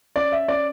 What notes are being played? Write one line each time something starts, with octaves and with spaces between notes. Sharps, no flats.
C#4 D5
E5
C#4 D5